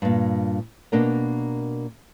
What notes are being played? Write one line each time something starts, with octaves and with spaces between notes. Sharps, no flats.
G2 A#2
B2 A#3 D4 A#4 D#5